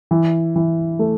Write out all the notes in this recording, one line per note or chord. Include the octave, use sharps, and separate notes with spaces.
E3
E3
A3